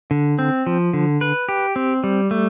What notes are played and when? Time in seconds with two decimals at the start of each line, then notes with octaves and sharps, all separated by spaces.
0.11 D3
0.39 C4
0.66 F3
0.93 D3
1.21 B4
1.49 G4
1.76 C4
2.04 G3
2.31 A3